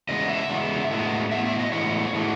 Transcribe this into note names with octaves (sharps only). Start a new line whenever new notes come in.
E2 C#3 G#3 B3 D#5
E5
E2 C#3 G#3 B3
A2 G#3 B3
A2 G#3 B3 E5
E5
D#5
A2 E3 G#3 B3 C#5
A2 E3 G#3 B3